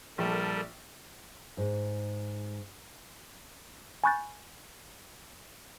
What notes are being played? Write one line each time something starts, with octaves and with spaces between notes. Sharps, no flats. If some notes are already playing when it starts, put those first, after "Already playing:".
A#1 G3 A4 A#4 A5
G#2
G#5 B5 C#6 F#6 G6 A6